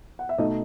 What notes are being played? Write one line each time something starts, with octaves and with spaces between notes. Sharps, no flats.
F#5
E5
B2 A3 D#4 D#5